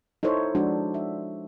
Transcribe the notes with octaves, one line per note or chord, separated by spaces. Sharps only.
D#4 E4 A4 C5 C#5
F3 G#3 D4 F#4
E5